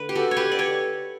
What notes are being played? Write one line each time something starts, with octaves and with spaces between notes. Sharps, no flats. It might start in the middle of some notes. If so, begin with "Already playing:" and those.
Already playing: D3 A3 B4
G4
F#4 A4
C#5
G4 B4
D5
A4 C#5